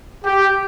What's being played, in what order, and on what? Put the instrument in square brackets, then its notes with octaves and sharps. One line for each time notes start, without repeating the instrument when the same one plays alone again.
[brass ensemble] G4